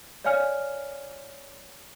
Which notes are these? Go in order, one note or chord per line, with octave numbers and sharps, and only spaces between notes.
C#5 D5 F5 G#5 F6